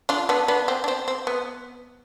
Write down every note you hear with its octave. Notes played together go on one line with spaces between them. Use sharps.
D4 F4
B3 D4
B3 D4
C4
D4
C4
C4
B3